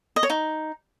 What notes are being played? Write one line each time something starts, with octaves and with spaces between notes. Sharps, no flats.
D#5
C#5
D#4